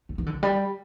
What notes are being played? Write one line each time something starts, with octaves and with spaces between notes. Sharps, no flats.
A3
E3
D3
E3
G3